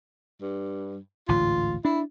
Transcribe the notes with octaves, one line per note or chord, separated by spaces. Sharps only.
G2
A1 D2 G#2 F4
D4 E4